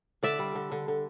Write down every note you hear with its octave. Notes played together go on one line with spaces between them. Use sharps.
D3 D5 E5
G3
D3
D3
D3